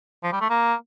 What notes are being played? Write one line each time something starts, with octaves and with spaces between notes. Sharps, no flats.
F3
G3
A3
A#3